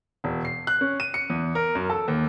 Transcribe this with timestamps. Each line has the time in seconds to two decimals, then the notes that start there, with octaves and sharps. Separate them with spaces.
0.24 E1
0.45 C7
0.67 F#6
0.81 C#4
1.00 D#7
1.14 C#7
1.30 E2
1.55 A#4
1.75 F#2
1.90 A4
2.08 D#2